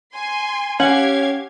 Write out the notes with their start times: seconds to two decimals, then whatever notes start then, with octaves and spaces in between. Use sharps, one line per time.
0.13 G#5 C6
0.80 C#4 G4 F5 F#5 G#6